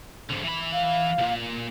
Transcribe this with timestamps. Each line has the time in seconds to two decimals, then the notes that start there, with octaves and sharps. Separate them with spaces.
0.30 G#2 D3
0.43 E3 B5
0.73 F5
1.18 C2 A#2